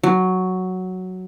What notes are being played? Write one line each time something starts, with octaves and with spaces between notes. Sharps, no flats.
F#3